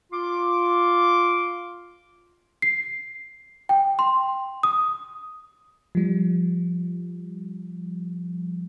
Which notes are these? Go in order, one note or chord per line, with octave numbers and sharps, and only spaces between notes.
F4 C6 D6
C7
G5
C6
D#6
F3 G3